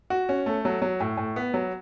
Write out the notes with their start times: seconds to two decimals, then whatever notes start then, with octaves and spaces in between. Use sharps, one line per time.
0.10 F#4
0.29 C#4
0.46 A3
0.65 F#3
0.82 F#3
1.00 A2
1.17 A2
1.36 B3
1.54 F#3